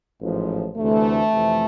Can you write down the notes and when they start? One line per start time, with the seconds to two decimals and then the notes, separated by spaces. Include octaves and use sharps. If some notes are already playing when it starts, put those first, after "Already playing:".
0.22 A1 G#2 F3
0.76 D2 C3 E3 A3
1.32 F2 C3 E3